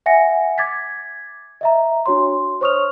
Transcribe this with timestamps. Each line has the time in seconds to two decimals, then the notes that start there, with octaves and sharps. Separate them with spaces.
0.06 E5 F#5 G#5 A#6 C#7
0.58 D6 G#6 A6 B6
1.61 D#5 E5 A#5
2.06 D4 F#4 C#5 C6
2.61 C5 C#5 C#6 D#6 F6 F7